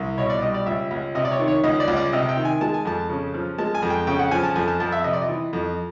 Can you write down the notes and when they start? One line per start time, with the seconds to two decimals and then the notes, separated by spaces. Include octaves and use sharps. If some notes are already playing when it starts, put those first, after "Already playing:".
Already playing: C2
0.18 B2 C#5
0.30 D5
0.42 G3 D#5
0.54 D5
0.66 C#2 E5
0.91 C#2
1.15 C3 D#5
1.25 D5
1.31 C#5
1.39 D#3
1.48 C#5
1.64 C#2 D#5
1.80 D5
1.88 C#2
1.96 D5
2.12 C3 D#5
2.29 G5
2.37 D#3
2.45 G#5
2.61 G#3 A5
2.74 G#5
2.85 F2 A5
3.09 C#3
3.34 F3
3.58 G#3 A5
3.75 G#5
3.82 F2
3.90 G5
4.07 C#3 G5
4.19 F#5
4.31 F3 G#5
4.43 A5
4.56 F2 G#5
4.68 A5
4.80 F2 A5
4.92 E5
5.04 C3 D#5
5.13 D5
5.22 D#5
5.29 E3
5.53 F2